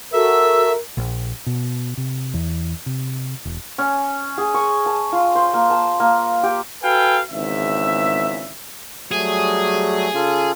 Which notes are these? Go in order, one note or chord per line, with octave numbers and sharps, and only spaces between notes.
F#4 A4 A#4 E5 E6
A#1
B2
C3
E2
C3
E1
C#4
G#4
C#6
A5
F4
C5
A#3
A5
A#3
G4
F#4 A4 B4 F5 G5 G#5
G#1 E2 C#3 E5
F#3 G3 A3 G#4
C#3 F4 A4